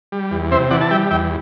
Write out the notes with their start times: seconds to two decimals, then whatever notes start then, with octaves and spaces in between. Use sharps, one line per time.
0.12 G3
0.31 E2
0.51 C3 C5 E5
0.70 E3 D5 F#5
0.81 A5
0.91 G3 E5 G5
1.11 E2 E5 G5